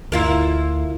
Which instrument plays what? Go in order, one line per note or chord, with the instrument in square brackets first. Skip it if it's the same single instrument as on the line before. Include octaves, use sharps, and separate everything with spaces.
[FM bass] D2 [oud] E4 F4 A#4